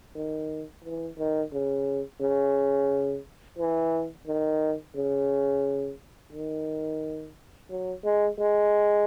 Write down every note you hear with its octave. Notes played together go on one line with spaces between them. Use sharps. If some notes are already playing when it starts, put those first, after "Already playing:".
D#3
E3
D#3
C#3
C#3
E3
D#3
C#3
D#3
F#3
G#3
G#3